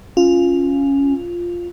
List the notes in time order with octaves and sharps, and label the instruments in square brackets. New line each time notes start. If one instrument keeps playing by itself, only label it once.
[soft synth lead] C#4 [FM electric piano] F4